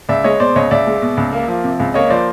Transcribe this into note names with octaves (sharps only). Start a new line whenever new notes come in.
C#2 D5 E5
G#3 C#5 D#5
B2 C5 D5
C#2 C#5 D#5
C#2 D5 E5
G#3
B2
C#2
A#3
F3
C3
C#2
A#3 C#5 D#5
F3 C5 D5